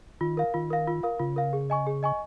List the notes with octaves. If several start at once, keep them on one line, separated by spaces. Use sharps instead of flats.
D#3 F4
A#4 F5
D#3 F4
A#4 F5
F4
A#4 F5
C#3 F4
A#4 F5
G#4
D#5 G#5 C#6
G#4
D#5 G#5 C#6